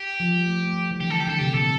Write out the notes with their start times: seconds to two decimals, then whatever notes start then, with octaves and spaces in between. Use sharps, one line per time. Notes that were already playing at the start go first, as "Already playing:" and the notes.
Already playing: G4
0.20 F3
0.37 G3
0.47 A3
0.66 A3
0.73 G3
0.91 E3
1.00 D3 G4
1.10 A4
1.20 G4
1.27 D3 A4
1.39 C3 G4
1.54 A#2 A4